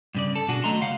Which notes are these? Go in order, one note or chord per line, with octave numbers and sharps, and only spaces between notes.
G2 C#3 D5
A4
B2 D4 F#4 G#4
D#2 F#3 A3 D#5 A#5 C6
C#2 F5 F#5